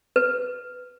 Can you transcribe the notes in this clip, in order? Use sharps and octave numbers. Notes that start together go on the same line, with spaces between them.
B4